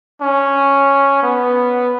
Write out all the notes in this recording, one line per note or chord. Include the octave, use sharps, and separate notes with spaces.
C#4
B3